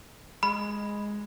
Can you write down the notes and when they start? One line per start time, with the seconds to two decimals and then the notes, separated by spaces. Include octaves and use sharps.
0.43 G#3 B5